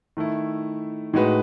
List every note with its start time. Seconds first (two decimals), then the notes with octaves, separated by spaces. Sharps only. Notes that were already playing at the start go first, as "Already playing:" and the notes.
0.17 D#3 A3 E4
1.14 A2 G#3 D#4 F#4 B4